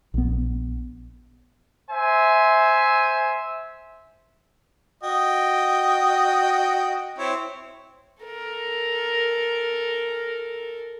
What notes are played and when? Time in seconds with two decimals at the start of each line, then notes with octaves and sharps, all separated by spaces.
0.14 A#1 B3
1.90 C5 E5 G#5
5.03 F#4 D#5 G5
7.18 C4 E4 C#5
8.23 A4 A#4